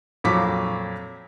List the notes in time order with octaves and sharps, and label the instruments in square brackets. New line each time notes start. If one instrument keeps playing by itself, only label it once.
[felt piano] F2 A#2 F#3 C#6 D6 B6